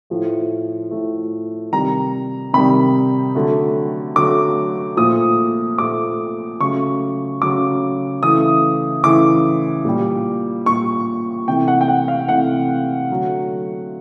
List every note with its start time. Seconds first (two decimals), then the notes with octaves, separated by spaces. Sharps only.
0.10 A2 F3 A3
0.91 A2 F3 A3
1.73 C3 D#3 G3 A#5
2.53 C3 D#3 G3 B5
3.35 D3 F#3 A3
4.16 D3 F#3 A3 D6
4.97 A#2 F3 A3 D#6
5.78 A#2 F3 A3 D6
6.60 C#3 F#3 A3 C#6
7.41 C#3 F#3 A3 D6
8.23 C#3 E3 A3 D#6
9.04 C#3 E3 A3 D6
9.85 A#2 G3
10.66 A#2 G3 C#6
11.48 C3 E3 A3 G5
11.68 F#5
11.81 G5
11.88 F#5
12.08 F5
12.29 C3 E3 A3 F#5
13.10 D3 F#3 A3